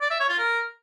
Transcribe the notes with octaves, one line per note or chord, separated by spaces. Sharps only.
D5
E5
C#5
F4
A#4